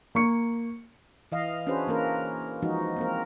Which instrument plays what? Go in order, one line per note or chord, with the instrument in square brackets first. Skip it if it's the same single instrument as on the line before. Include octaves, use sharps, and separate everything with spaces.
[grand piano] A#3 C#6 C#7
[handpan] E3 D#5 F5
C#4 D4 F#4 G#4 B4 C5
E3 A#3 C#4 A#4 B4
E3 F3 G#3 D#4 F#4
A#3 C4 A#4